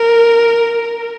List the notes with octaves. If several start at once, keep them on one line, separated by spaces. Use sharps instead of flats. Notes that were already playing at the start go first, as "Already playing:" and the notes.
Already playing: A#4